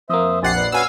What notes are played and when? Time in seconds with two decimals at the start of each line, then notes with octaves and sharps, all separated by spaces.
0.10 F2 A#3 C5 E5 D#6
0.43 A#1 G4 C5 F#5 G#5 A6 C7
0.55 B4 D5
0.72 C#4 F#4 B4 F5 G#5 E6